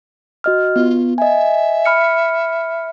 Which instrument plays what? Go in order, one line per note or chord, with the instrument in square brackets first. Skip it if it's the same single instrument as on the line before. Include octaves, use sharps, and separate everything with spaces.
[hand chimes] F#4 D#5 F6
[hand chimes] B3 [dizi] F4
[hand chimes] D#5 G#5 [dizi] E5
[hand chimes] B5 F6 C#7